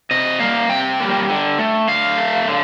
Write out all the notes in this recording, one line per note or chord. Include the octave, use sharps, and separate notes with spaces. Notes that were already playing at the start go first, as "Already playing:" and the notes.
C3 D#5
G3 A#3 F5
C3 G5
G3 A#3
D3
A3
D3 F5
A3
D3